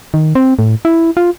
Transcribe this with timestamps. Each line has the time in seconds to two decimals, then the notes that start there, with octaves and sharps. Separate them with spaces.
0.14 D#3
0.35 C4
0.59 A2
0.85 E4
1.17 F4